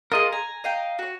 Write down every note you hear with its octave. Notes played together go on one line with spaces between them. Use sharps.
F4 G#4 A#4 D#5
G#5 A#5
D#5 F5 G5
F#4 C#5